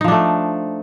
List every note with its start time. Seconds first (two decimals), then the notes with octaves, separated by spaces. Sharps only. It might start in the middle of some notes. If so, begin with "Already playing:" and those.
0.01 D#4
0.04 F3
0.08 D4
0.12 A3